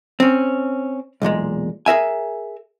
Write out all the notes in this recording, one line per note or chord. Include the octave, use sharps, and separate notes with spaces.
C4 C#4
B1 E2 A#2 G#3
G#4 A#4 E5 G#5